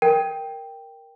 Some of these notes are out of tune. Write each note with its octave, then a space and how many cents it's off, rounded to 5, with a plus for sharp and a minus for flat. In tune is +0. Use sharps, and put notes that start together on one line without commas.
A#4 +0 G5 +0